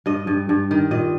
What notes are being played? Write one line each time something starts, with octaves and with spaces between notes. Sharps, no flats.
G2 D#5
G2
G2
D#3
A#2 D#5